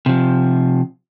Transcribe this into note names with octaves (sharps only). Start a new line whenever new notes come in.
C3 F3